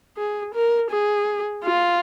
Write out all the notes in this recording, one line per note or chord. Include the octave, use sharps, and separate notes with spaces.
G#4
A#4
G#4
F4